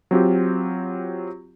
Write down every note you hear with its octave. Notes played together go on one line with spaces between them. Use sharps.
F#3 C4 F4 G4